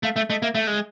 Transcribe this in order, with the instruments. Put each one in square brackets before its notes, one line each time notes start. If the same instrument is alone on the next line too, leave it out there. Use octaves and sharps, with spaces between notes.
[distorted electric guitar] A3 [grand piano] F5
[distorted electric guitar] A3 [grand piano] E5
[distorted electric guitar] A3 [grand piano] D#5
[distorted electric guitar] A#3 [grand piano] E5
[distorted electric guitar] A3 [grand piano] E5
[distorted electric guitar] G#3